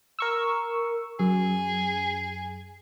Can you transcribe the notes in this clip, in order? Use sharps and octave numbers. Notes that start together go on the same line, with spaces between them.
A#4 C#6 E6
F#2 G#4